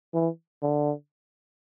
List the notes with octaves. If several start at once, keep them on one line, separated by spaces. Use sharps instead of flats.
E3
D3